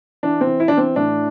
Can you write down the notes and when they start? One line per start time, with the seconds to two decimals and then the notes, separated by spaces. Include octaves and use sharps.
0.23 E3 D4
0.41 C4
0.47 E3
0.60 E4
0.68 E3 D4
0.77 C4
0.96 A2 D4